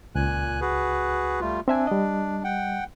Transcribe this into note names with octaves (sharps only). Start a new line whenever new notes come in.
C#2 A#2 G#5 F#6
F#4 G#4 B4
G3 A3 F4
C4 D4 E5 G#5
G3 D#5
F#5 G5